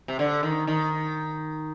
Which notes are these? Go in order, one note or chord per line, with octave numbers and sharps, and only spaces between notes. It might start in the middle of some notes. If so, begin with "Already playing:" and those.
C3
D3
D#3
D#3